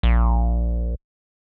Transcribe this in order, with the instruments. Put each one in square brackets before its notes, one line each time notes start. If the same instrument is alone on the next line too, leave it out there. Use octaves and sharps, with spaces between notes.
[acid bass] A#1